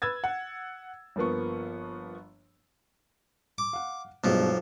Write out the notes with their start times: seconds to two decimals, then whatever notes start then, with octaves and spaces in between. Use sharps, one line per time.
0.02 B4 E6 G#6 A6
0.24 F#5
1.16 G1 F3 A#3 B3 C#6
3.58 D6
3.73 F5 F#5
4.24 B1 G2 B2 F3 G#3